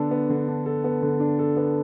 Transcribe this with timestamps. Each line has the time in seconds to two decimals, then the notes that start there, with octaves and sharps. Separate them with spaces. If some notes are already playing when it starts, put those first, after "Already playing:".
Already playing: D3 B3 D4 A4
0.11 B3
0.30 D3
0.48 D4
0.66 A4
0.84 B3
1.02 D3
1.20 D4
1.39 A4
1.57 B3